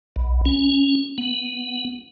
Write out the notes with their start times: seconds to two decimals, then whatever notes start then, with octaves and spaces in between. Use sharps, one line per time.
0.16 B1
0.45 C#4
1.18 B3